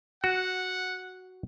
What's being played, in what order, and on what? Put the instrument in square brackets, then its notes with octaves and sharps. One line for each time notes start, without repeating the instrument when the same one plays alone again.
[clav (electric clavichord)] F#4 [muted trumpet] F#5